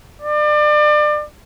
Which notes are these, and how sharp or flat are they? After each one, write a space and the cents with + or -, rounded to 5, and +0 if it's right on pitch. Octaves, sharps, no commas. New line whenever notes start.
D5 +30